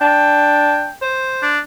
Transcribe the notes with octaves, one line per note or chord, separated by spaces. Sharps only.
D4 G5
C5
D4